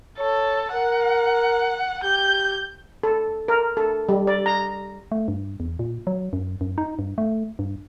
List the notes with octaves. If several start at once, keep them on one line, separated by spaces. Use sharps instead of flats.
A4 C#5
A#4 F#5
G4 G6
A4
A#4
A4
G3
D5
A#5
A3
G2
E2
A#2
F#3
F#2
F#2
D#4
G2
A3
G2